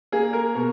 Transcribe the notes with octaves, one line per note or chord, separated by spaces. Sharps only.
A#3 G#4
A#4
B2